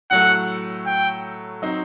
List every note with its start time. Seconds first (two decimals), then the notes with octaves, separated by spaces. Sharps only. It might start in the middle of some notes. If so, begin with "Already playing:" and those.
0.11 A2 F#3 A3 F#5
0.86 G5
1.62 F#3 C4 D#4